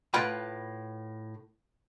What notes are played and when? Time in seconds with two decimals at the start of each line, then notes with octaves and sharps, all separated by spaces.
0.14 A2 F4 B4 F#5 G5 B5